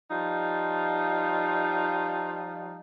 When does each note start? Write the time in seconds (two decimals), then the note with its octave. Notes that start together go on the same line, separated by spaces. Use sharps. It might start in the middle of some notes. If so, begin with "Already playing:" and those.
0.10 F3 G3 D#4 F4